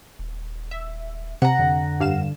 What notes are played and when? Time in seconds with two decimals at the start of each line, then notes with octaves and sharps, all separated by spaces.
0.19 D#1
0.71 E5
1.42 C3 F#5 A#5
1.59 F2 D3
2.00 G2 F5 E7